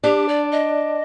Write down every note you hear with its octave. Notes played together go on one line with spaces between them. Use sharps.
D4 G4
D5
D#5